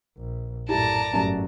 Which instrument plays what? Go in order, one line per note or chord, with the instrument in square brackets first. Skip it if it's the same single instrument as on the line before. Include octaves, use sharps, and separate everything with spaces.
[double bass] A#1
[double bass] F#2 A2 [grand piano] E4 G4 [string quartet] D5 A5 A#5
[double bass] G1 F#3 [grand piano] F#2 A2 G3